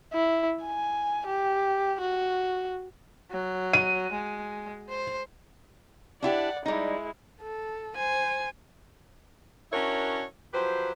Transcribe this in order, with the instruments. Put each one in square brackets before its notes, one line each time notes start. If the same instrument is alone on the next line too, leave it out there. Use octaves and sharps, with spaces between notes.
[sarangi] E4
G#5
G4
F#4
F#3
[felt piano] D#7
[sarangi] G#3
C5
[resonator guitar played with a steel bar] D4 E4 G4 [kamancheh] D5 F#5
[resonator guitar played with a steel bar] G3 D#4 [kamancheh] G#3 E4
[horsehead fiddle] A4
C5 G#5
[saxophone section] C#4 D4 E4 F#4 A#4 C#5
F3 F#3 G4 B4 C5